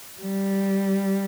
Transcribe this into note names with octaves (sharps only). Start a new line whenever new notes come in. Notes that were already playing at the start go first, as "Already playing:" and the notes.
G3